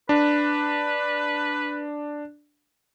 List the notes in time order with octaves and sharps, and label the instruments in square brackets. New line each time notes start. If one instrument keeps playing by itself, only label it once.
[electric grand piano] D4 [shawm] B4